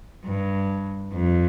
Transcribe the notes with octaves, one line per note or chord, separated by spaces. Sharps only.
G2
F2